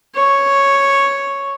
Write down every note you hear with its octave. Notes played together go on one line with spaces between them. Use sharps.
C#5